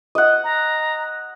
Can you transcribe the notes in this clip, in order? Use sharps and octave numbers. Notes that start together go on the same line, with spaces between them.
D#5 F#5
A#5